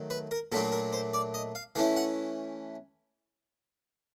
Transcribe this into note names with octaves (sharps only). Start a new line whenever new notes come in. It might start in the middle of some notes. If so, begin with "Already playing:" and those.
Already playing: D#3 F#3 A3
B4
A#4
A#2 F#3 A3 D4 F4 A4
A#4
C5
D5
D#5
F5
E3 A3 C#4 E4 F5
F#5